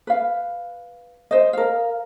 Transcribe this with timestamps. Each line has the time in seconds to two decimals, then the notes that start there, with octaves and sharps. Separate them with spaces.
0.07 B4 F5
1.31 C5 D#5
1.53 A#4 F5